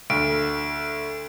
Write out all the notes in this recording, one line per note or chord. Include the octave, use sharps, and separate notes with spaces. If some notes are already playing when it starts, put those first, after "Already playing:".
D2 D7